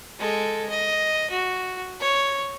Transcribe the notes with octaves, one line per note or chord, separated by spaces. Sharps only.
G#3 A4
D#5
F#4
C#5